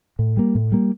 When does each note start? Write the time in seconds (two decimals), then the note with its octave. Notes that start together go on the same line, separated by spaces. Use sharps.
0.19 A2
0.37 G3 A#3
0.55 A2
0.72 G3 A#3